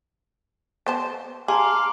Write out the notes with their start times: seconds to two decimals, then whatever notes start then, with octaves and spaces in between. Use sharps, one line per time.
0.86 B3 C5 A5
1.48 G#4 F5 A5 A#5 C6 D6